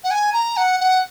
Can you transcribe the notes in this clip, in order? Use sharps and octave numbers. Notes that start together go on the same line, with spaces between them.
F#5
G#5
A#5
F#5
F#5